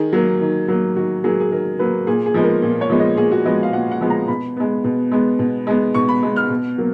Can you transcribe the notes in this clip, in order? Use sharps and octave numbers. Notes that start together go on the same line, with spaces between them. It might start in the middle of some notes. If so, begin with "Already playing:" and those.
Already playing: D#3 G#4
F#3 A#3
D#3
F#3 A#3
D#3 F#4
F#3 A#3 G#4
G#4
D#3 A#4
F#3 A#3 B4
A#2 G#4
G#4
F3 G#3 B3
A#4
A#2
C#5
F3 G#3 B3
D#5
A#2 G#4
F#4
F3 G#3 B3 D#5
F5
A#2 F#5
F#5
F3 G#3 B3
A#5
B2 B5
G#3 B3
B2
G#3 B3
B2
G#3 B3
B2 C#6
B5
G#3 B3
F6
B2
F#3 A#3